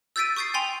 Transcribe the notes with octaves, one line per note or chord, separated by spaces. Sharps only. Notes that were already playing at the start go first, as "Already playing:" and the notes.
E6 G6 A6 B6 D7 D#7
C#6 D#6 G6 A6 C7
G5 G#5 C6 F7